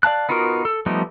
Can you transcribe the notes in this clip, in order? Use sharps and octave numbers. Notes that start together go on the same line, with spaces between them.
D5 F5 A5 F#6
B3 D#4 F4 F#4 A#4
A4
F3 G3 A3 B3 D#4